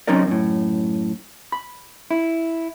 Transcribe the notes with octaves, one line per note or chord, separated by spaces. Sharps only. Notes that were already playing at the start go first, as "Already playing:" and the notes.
F#3 C4 C#4 D#4 A#4 D5
F#2 A2
B5
E4